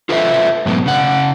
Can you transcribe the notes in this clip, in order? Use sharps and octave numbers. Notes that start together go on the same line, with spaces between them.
F4 A4 B4 C5 D5 E5
G#2 B2 F#3 A3 B3
C#3 F#5